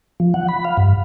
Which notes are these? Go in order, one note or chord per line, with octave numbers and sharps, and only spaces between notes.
F3
F#5
B5
F5
G2